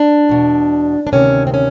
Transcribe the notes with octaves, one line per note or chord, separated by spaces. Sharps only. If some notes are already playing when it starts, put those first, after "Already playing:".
Already playing: D4
E2 B2
D4
D2 C3 D#3 C#4
C4
C#4